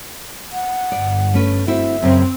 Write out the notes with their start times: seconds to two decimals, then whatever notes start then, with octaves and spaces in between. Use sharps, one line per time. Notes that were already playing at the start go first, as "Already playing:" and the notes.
0.53 F#5
0.92 G1 D5
1.34 A3 C#4 B4
1.67 C4 E4 F#4 E5
2.03 F#2 C#3 C4